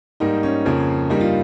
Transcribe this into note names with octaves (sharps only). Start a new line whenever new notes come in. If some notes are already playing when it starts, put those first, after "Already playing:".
G#2 G3 A#3 D#4
C#4
F2 C#3 F3 A#3
G2 G3 A#3 D#4
F4